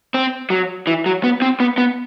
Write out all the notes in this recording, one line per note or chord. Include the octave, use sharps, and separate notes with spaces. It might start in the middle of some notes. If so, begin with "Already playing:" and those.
C4
F#3
E3
F#3
B3
C4
B3
B3